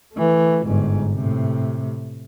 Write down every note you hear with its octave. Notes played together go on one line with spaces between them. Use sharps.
E3 A3
G1 G#2
A2 C3